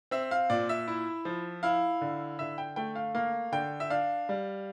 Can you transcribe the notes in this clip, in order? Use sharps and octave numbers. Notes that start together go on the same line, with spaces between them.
C4 E5
F5
A#2 D5
E5
E4
F3
E4 F5
D3
D3 E5
G5
A3 G5
F5
A#3 F5
D3 G5
E5
D4 F5
G3